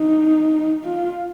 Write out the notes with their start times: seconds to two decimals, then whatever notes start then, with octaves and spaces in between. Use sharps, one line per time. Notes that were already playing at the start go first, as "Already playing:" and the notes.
Already playing: D#4
0.85 F4